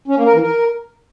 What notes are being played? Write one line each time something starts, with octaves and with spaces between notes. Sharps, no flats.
C#4
A#3
A#4
E3
A#4